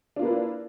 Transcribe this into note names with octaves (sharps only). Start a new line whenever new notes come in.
A#3 D4 E4 F4 B4